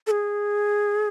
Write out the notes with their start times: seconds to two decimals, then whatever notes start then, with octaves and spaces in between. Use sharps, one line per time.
0.07 A4
0.11 G#4